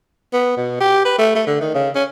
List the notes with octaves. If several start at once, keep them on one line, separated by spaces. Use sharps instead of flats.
B3
B2
G4
B4
A3
A3
D3
D#3
C#3
C#4